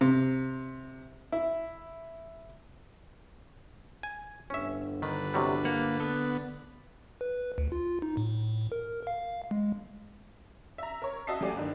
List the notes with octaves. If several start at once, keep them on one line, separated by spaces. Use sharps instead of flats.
C3
E4
G#5
G1 G2 C#4 E5
D3 D#3 B4
C3 F#3 G3
A#3 F#5
B3 A4
B4
D2
F4
D#4
A2
A#4
F5
G#3
E5 A#5
A#4 C#5
F#4 D#5 E5 A5 D#6 C7
F#3 A3 G4 D5 G#5
G1 D3 D#3